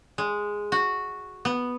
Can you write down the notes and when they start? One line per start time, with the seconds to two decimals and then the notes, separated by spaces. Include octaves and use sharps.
0.18 G#3
0.72 F#4
1.45 B3